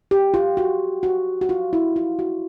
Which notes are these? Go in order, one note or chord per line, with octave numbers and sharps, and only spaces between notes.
G4
F4
F#4
F#4
F#4
F4
E4
F4
F#4